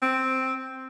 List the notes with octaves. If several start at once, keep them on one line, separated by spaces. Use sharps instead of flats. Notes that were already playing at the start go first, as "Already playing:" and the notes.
C4